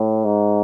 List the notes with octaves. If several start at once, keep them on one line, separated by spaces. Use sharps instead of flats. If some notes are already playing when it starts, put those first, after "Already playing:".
Already playing: A2
G#2